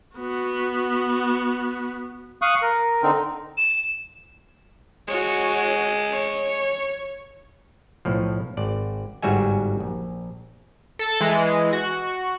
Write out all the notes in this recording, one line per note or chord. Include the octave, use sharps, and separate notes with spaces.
B3 F#4
F5 C#6 D#6 F#6
A#4
D3 C4 D#4
E7
G#3 F#4 C#5
C#5
B1 A2 F3
G#1 D5
G1 G#2 G3 F#4 E5 G#5
A#1
A4 A5
E3 G#3
F#4